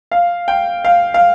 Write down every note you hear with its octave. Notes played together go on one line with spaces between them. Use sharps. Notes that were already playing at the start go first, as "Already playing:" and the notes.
F5
G5
F5
F5